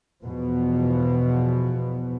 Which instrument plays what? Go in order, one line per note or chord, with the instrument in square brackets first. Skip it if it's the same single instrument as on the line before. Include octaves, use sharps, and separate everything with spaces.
[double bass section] E2 B2 F3 B3